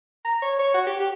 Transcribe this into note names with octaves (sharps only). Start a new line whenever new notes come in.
A#5
C#5
C#5
F#4
G4
G4